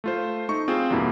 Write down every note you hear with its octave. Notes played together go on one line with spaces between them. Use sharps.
A3 F4 C5
A3 D#4 C#6
C4 F4 G#4 C5
E2 G2 B2 A#3 E4